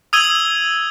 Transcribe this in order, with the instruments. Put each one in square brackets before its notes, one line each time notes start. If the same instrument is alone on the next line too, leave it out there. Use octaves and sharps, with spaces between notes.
[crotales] D#6 E6 G#6 D#7 F#7 G7